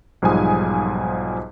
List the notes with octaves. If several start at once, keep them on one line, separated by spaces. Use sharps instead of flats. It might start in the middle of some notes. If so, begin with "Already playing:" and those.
B1 G#2 F3 G3 G#5 D#6